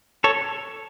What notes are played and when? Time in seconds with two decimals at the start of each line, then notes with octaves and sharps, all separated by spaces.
0.24 A4 C#5